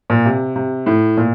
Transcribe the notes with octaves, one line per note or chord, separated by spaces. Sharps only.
A#2
C3
C3
A2
A#2